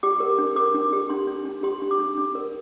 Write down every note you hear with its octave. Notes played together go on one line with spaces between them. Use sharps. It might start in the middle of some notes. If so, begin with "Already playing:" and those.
G4 D6
A#4
D4
A#4 D6
D4
G4
D4 C6
D4
D4
G4 C6
D4
D6
D4
D4
A#4